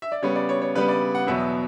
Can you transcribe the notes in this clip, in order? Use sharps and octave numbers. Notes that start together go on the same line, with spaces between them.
E5
D5
C#3 G3 B3 C#5
D5
C#5
C#5
C#3 G3 B3 B4
D5
F#5
E2 B2 F#3 B3 E5